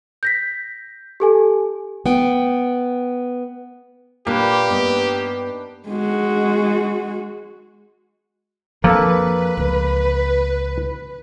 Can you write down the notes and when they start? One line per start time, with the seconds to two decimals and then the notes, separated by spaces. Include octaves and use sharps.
0.23 G6 A#6 B6
1.20 G4 A4 G#5
2.06 B3 G5
4.27 A#2 A#3 D4 G4 B4
4.70 G2 B3 D#4
5.88 G#3 F#4
8.84 F2 F3 A#3 D4 A4 B4
9.57 C#2